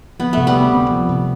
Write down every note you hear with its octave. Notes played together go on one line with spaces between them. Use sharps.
F3 B3
C3 A3
G3 B3
D2
C4
F3
C3